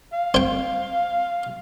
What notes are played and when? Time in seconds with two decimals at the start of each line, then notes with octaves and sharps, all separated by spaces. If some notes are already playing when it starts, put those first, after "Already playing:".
0.12 F5
0.34 C4 G5